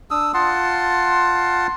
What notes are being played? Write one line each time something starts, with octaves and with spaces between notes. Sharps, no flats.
D4 D#6 E6
F4 F#5 A5 C6